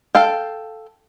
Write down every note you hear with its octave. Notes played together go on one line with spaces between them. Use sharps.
A4 F5 G5